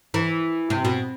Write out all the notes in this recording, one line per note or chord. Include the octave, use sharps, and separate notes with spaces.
E3
C3
B2